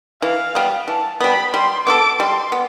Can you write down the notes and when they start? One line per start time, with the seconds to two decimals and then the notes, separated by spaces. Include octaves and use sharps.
0.22 E3 F5
0.55 G3 B3
0.88 E3 A5
1.21 G3 B3 B5
1.54 G3 C6
1.87 B3 F4 A4 D6
2.19 G3 C6
2.52 B3